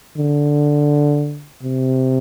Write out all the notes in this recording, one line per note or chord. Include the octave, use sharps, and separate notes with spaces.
D3
C3